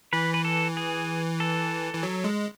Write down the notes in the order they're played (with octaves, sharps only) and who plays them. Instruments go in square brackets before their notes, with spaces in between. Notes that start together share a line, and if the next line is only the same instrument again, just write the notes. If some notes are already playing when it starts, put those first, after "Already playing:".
[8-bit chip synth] E3 [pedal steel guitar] B4
[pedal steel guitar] B4
A4
G#4
A4
[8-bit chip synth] E3
F#3
G#3